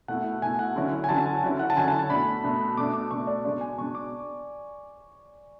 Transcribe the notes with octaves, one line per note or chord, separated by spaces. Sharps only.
B2 A3 E4 F#5
B2 A3 E4 G#5
F#5
D3 F#3 C#4 E4
G#5
D3 F#3 C#4 E4 A5
G#5
D3 F#3 C#4 E4
F#5
A5
D3 F#3 C#4 E4 G#5
A5
A5
B2 A3 D4 B5
B2 A3 D4
B2 A3 D4 D6
D6
B2 A3 D4 C#6
D5
B2 G#3 D4 D5
G#5
B2 G#3 D4 C#6
D6